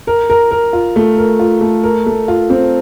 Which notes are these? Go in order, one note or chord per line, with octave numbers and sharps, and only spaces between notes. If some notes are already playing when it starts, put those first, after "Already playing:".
A#4
A#4
A#4
F4
A3
A#4
F4
A3
A#4
A3
F4
C4